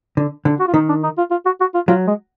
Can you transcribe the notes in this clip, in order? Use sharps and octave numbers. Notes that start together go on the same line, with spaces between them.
D3
D3
F#4
F4
D#3 D#4
D4
D#4
F4
F4
F#4
F#4
F4
F#3 F4
G#3